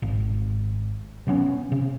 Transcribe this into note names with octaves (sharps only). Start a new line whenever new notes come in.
G#1
C3 F#3 B3 C#4
C3